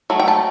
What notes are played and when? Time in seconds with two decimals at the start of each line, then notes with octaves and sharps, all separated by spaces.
0.10 F#3 A3
0.20 G5
0.28 A5